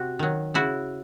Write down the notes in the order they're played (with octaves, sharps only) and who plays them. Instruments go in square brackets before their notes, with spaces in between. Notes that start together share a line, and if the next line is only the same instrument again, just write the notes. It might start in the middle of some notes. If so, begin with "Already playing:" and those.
Already playing: [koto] C3 F#4
D#3 F#3
C#3 E4 F#4